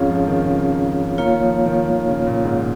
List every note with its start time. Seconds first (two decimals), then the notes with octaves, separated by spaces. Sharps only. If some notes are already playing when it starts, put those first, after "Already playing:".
Already playing: F2 G#2 C#4 F4 G#4 C#5 F5
0.09 F3
0.27 D#3
0.46 C#3
1.18 D#3 A#3 F4 C#5 F5
1.43 F3
1.66 D#3
1.90 D#3
2.09 C#3
2.27 A#2
2.45 G#2